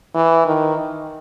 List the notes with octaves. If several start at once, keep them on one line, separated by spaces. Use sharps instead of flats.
E3
D#3